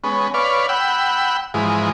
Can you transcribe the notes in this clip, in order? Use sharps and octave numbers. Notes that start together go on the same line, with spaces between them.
G#3 B3 C#4
B4 C#5 D5 F5
F#5 G5 B5 E6
G#2 E3 F3 G#3